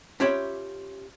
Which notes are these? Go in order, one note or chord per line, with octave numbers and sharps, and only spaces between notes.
C#4 F4 G4 C#5 E5 B5